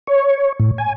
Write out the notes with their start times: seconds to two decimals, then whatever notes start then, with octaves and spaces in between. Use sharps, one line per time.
0.07 C#5
0.60 A2
0.78 G#5